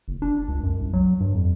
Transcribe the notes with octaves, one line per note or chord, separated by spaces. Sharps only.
F#1
D4
C#2
F#2
C2
F#3
G2
F2